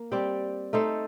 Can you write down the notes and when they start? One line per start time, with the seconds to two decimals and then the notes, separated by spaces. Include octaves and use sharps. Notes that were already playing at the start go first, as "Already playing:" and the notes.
Already playing: A#3
0.12 G3 C4 G4 D5
0.73 A3 D#4 A4 C5